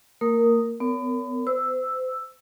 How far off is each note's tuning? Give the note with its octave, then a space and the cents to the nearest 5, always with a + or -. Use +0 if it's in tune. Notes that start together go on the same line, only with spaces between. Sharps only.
A#3 -30 A#4 +0 D#6 +0
B3 +35 A#4 -15 C#5 +30
C5 -35 E6 +0